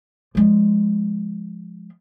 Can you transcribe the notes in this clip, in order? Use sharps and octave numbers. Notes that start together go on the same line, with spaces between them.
F3 G#3